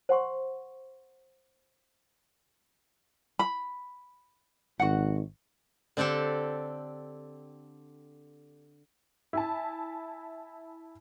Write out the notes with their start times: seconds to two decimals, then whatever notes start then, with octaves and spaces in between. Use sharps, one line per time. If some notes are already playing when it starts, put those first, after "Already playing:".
0.09 C5 F#5 C6 C#6
3.39 B5
4.80 G#1 F#4 F#5
5.97 D3 C4 D4 G4 A4
9.33 E4 G#5 A5